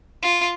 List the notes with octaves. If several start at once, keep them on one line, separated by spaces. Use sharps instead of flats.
F4